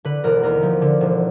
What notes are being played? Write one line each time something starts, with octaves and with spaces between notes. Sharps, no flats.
D3 B4
E1 A#4
D#2 A#4
F3
D3
E1